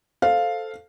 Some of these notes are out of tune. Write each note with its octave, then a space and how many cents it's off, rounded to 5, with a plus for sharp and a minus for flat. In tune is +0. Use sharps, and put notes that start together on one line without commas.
A4 +0 C5 +0 F5 +0